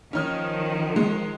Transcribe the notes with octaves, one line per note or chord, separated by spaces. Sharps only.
D#3 F3 C#4 D#4 F6
G#3